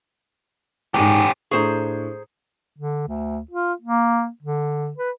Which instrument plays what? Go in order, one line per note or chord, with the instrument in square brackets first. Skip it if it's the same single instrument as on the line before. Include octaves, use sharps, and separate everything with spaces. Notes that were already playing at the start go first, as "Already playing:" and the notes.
[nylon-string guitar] E2 G#2 [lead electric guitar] C#4 G4
[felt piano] A2 D4 C#6 [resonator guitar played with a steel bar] G#4 C5 A#5
[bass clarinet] D3
D2
F4
A#3
D3
B4